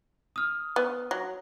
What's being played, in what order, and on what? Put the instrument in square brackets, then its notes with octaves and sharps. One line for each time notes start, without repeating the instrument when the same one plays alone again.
[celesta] D#6 F6
[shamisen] B3
F#3